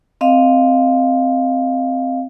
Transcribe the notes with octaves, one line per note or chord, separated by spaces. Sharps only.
C4 D#5 F5